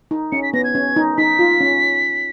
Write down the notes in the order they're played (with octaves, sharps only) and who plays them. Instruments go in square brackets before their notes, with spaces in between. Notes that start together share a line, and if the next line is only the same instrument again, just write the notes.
[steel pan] D#4
[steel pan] C#4 [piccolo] C#7
[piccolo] B6
[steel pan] B3 [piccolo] A#6
[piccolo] G#6
[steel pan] C#4
D#4
[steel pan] D#4 [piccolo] B6
[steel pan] F4
C#4